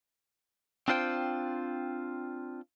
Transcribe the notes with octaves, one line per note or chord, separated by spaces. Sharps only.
C4 D4 F4 C5 G5